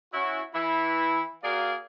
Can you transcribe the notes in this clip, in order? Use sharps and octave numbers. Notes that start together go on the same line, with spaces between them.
C#4 E4 F#4
E3 E4
A#3 F#4 G#4 A#4 D5 F5